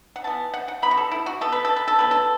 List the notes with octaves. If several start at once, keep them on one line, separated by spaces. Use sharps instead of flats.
F#5
E3 B3 A5
F#5
F#5
B2 B3 B5
F#4
A4
E4
F#4
B2 B3 A4
B4
A4
B4
A4
B2 F#3 B4
A4